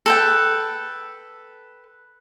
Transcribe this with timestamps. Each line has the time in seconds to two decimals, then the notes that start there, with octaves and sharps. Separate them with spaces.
0.06 A4 B4 G5